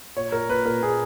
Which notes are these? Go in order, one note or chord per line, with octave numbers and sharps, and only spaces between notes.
A#2 C#5
A#2 A#4
A#2 B4
A#2 A#4
A#2 G#4